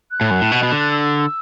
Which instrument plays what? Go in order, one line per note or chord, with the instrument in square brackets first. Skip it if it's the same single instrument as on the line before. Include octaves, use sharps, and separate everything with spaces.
[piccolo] F#6
[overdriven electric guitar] A2
F#2
A2
B2
B2
D3
[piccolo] F#6
E6